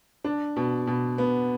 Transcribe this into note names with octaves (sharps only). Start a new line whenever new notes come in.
D4
B2
B2
B3